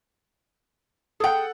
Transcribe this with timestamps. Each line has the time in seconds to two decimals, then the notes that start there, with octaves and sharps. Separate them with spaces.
1.20 G#4 A4 F#5 G5